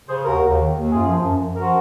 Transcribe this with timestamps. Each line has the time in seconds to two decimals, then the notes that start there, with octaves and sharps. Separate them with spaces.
0.08 C#3 G#4 C5
0.24 D#2 F#4 A#4
0.42 D#2
0.58 D#3
0.75 D#2
0.90 F#2 F4 G#4
1.07 F3
1.24 F#2
1.40 F#2
1.56 F3 F#4 A#4